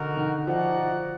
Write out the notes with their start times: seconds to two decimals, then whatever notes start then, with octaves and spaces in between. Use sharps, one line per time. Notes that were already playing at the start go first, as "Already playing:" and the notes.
Already playing: D3 D#4 F#4 A#4
0.17 D#3
0.47 F3 D#4 F#4 D5 F#5
0.77 F3